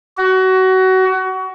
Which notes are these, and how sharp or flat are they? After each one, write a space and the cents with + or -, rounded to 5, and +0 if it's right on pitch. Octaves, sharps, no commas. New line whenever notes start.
F#4 +25